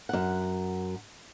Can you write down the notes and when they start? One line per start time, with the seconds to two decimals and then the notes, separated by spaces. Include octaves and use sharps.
0.09 F#2 F#5